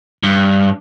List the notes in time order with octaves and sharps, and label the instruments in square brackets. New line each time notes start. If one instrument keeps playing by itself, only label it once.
[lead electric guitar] G2